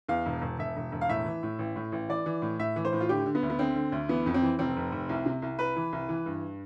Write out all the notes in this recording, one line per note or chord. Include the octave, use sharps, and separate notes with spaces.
E2 F5
E1
E1
E1 E5
E1
E1
F5
A2 E5
E3
A2
A1
A2
A1
E3 D5
E3
A2
A2 E5
E3
C5
A2
F4
D3 G4
D3
B3
D2
B3
D3 C4
D3
D2
E3 B3
F2
C4
E3
F1 C4
F1
F1
C2
C3
C2
C2 B4
E3
C2
E3
G2